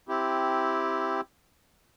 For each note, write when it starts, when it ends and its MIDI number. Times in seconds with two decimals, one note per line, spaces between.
0.09 1.21 60
0.09 1.21 64
0.09 1.21 67